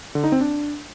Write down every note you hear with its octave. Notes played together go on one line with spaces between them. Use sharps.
D3
D#4
C4
D4